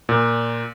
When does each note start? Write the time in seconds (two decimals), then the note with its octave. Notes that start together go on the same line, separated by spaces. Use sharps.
0.09 A#2